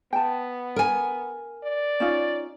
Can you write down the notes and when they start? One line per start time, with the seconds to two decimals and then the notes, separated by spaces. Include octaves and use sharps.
0.13 B3 G5 A5
0.76 A#4 G#5
1.64 D5
2.00 C#4 D#4 F4